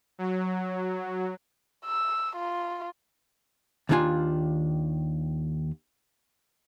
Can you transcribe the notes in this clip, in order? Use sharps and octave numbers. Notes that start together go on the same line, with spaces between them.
F#3
E6
F4
D#2 D#3 F#3 D4 F4 G#5